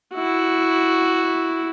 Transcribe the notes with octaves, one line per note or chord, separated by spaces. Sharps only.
E4 F#4